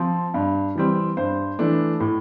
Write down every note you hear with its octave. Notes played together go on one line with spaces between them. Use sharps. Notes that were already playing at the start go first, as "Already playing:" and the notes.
Already playing: F3 C4
G2
E3 G3 C4
G2 C5
E3 A3 D4
A2